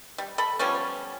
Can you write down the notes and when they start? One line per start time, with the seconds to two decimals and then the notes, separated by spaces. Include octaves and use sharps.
0.18 G3
0.38 A4 B5
0.59 F3 G3 B3 C#4